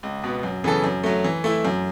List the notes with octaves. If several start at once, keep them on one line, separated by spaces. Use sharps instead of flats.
C#2
B2 B3
F#2
C#3 E3 B3 A4
F#2
F#3 A3
E3
A3 E4
F#2